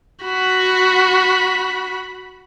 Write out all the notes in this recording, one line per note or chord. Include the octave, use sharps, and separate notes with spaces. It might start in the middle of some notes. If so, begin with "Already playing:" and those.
F#4 B5